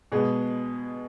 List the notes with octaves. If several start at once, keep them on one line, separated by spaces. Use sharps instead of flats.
B2 G#3 B3 G#4